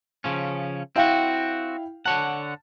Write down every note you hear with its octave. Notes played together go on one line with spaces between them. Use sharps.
C#3 F3 C#4
C4 E4 F#4 F5 G5
D3 C#5 F#5 A5